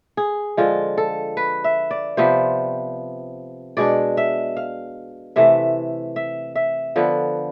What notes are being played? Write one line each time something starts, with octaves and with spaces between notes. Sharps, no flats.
G#4
D3 F3 G#3 F4
A4
B4
E5
D5
C3 F3 B3 C5
B2 G#3 D4 D5
E5
F5
C3 E3 A3 E5
E5
E5
D3 F3 B3